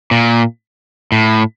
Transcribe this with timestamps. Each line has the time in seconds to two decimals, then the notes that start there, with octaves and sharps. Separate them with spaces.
0.11 A#2
1.12 A2